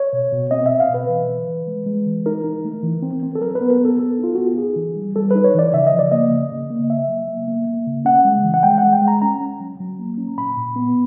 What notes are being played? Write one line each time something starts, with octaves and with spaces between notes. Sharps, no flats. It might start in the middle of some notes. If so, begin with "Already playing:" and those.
Already playing: C#5
B2
B2
C4 D#5
B2 E5
F5
B2 B4
E3
E3
E3
G#3
G#3
E3
D#4 A#4
D#4
A3
E3
C4
C4
A4
F#3 A#4
B4
B3
A#4
B3 A4
B3 A4
D#4 F4
B3 F#4
G4
D#4 G#4
E3
G3
G3 A4
D#4 B4
C#5
E3 D5
C#3 E5
D#5
F3
D5
A#3 D#5
C#3
C#3
A#3
C#3 E5
F#3
A#3
A#3
A#3
C#3
C#4 F#5
G#3
E3
F#5
G#3 G5
G#3 F#5
G5
G#3
A#5
C#4 A#5
C#4
F#3
F#3
A#3
C#4
A#2 B5
A#2
B3